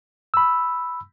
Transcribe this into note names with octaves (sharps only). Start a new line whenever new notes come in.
B5 E6